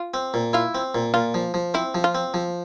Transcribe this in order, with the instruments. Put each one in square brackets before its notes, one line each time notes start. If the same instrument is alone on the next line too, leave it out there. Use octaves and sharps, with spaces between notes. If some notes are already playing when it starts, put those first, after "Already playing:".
Already playing: [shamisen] F4
[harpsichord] C4
A#2
[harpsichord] E4 [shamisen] F4
[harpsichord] C4
A#2
[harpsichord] A#2 [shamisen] F4
[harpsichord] F3
F3
[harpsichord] C4 [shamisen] E4
[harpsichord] F3
[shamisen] F4
[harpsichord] C4
F3